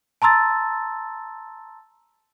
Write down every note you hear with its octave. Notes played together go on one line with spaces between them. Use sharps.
A5 A#5 C6 E6 A6